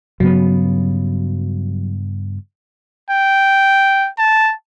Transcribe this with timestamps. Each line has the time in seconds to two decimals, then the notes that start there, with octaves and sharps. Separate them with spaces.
0.20 G2 C#3 F#3 B3
3.10 G5
4.19 A5